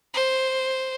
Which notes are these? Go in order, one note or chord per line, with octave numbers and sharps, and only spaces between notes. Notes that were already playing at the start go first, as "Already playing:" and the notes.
C5